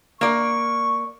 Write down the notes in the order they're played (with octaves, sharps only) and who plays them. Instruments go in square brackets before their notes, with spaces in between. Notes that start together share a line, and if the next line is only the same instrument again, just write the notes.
[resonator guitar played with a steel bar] A#3 D5 [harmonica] C#6